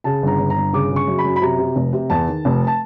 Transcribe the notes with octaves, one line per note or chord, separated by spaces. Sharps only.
C#3 A5
G1 A#5
G1
A#5
G1
C#3 D6
C#3
C#6
F#2
B5
F#2
B5
C3 A#5
C3
F1
C3
E2 A5
D#3
F1
A5